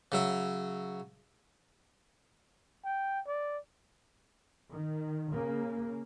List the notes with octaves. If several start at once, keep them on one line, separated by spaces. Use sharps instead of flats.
C#3 F#3 E5
G5
D5
D#3
C#3 A#3